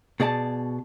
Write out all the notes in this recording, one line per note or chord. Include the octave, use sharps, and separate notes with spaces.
B2 G#4 D5 A5